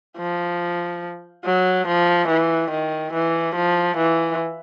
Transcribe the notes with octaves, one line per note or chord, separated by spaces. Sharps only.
F3
F#3
F3
E3
D#3
E3
F3
E3